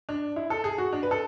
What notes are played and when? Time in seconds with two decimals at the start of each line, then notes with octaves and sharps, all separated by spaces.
0.09 D4
0.36 E4
0.50 A4
0.64 G#4
0.78 F#4
0.93 D4
1.03 B4
1.11 A4